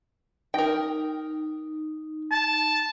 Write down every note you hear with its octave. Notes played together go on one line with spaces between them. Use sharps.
D#4 A#4 G5
A5